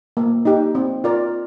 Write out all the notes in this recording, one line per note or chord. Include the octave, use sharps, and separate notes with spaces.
A#3
D#4 G4
C4
F4 A#4 D5